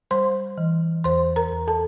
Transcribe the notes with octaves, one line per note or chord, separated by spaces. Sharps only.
G3 C5 C6
E3
E2 C5 C6
A#4 A#5
E2
A4 A5